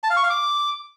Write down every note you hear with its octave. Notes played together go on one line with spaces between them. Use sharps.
A5
F5
C#6
F5
D6